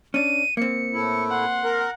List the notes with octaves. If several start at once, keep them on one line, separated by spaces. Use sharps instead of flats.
C#4 D4 D#7
A#3 C4 C#7
A2 A3 E4
F#5 C6
A#4